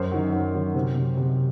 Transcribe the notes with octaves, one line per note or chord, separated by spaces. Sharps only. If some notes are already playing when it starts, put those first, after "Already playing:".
Already playing: F#2 C5
D#3 F#3
F#2
D#3 F#3
C3 C5
F#3 C4
C3